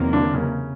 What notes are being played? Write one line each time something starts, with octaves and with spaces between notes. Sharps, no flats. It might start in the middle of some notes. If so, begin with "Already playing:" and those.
Already playing: E2 C3 D#3 F#3 A#3
D3 D4
C#3 C#4